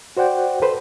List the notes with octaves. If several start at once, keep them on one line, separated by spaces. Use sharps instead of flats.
F#4 C5 D5 F#5 G5
A4 B4 C5